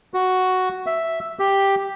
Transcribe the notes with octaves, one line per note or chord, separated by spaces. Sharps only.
F#4
E5
G4